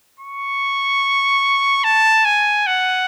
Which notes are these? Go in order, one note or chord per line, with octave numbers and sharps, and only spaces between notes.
C#6
A5
G#5
F#5